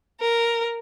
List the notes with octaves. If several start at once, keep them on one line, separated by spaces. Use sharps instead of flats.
A#4